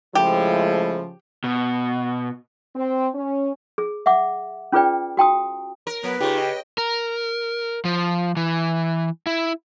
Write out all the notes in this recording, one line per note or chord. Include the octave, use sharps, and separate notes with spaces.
C#3 F3 G#3 A3 E4 G4
B2
C4
C#4
G#4
E5 F#5 D6
C#4 F4 G#4 B4 D5 G5
F#4 G5 A5 D#6
A#4
F#3 B3 B4
C#3 D#4 F4 G4
D#5 G5
A#4
F3
E3
E4